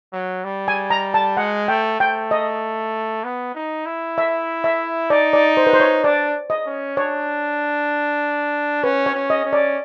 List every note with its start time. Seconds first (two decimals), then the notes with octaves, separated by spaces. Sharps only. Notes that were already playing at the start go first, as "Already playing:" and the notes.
0.13 F#3
0.44 G3
0.68 G#5
0.90 A#5
1.14 A5
1.37 G#3 F#5
1.68 A3 G5
2.00 A3 G5
2.31 D#5
3.24 B3
3.55 D#4
3.86 E4
4.18 E5
4.64 E5
5.10 D#4 D5
5.33 D5
5.57 C5
5.67 B4
5.73 C5
5.80 C#5
6.04 D4 D5
6.50 D#5
6.66 C#4
6.97 D4 C#5
8.83 C#4 B4
9.06 C#5
9.14 C#4
9.30 D#5
9.45 C#4
9.53 D5